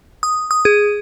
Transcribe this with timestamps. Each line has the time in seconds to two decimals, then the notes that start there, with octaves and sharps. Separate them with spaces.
0.23 D#6
0.51 D#6
0.65 G#4